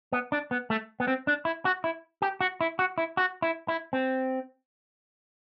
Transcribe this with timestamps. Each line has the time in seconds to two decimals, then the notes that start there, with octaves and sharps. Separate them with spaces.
0.12 B3
0.32 D4
0.51 B3
0.70 A3
1.00 B3
1.08 C4
1.27 D4
1.45 E4
1.65 F#4
1.84 E4
2.22 G4
2.41 F#4
2.61 E4
2.79 F#4
2.98 E4
3.17 F#4
3.42 E4
3.68 E4
3.93 C4